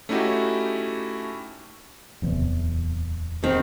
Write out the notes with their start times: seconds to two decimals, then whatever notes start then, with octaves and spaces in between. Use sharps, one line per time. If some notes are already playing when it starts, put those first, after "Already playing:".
0.09 A3 C#4 D#4 E4 F#4 G4
2.22 D1 E2 C3
3.44 D#3 C4